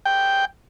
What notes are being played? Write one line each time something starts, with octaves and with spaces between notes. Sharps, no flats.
G5